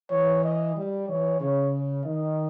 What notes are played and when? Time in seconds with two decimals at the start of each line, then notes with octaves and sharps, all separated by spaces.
0.11 E3 C#5
0.44 D#5
0.76 G3
1.09 E3 C#5
1.40 C#3 C#5
2.05 D#3 D#5